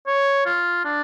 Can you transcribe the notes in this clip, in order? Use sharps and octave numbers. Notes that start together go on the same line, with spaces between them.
C#5
F4
D4